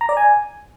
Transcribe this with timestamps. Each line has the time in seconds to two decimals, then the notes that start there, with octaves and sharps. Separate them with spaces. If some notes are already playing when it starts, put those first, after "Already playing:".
0.01 A#5
0.09 D5
0.17 G#5